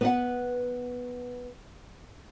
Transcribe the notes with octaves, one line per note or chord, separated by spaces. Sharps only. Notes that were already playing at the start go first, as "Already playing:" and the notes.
B3 B4 F#5